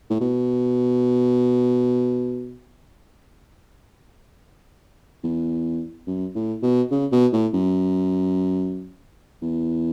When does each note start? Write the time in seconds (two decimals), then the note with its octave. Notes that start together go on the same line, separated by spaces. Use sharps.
0.10 A2
0.21 B2
5.24 E2
6.07 F#2
6.35 A2
6.63 B2
6.91 C#3
7.12 B2
7.33 A2
7.54 F#2
9.42 E2